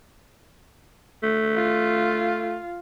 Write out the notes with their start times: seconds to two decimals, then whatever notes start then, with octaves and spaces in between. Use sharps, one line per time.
1.23 A3
1.56 F4